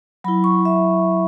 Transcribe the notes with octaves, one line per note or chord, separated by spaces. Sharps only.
F#3 E4 B5
C#6
E5